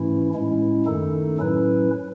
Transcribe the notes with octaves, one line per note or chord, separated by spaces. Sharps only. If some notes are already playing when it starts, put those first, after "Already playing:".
Already playing: G#2 E3 A3 C#4 E4
A2 G#3 C#4 E4
F#2 D#3 A3 D#4 A4
A2 F#3 C#4 E4 B4